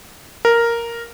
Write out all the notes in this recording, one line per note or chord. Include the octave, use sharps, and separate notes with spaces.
A#4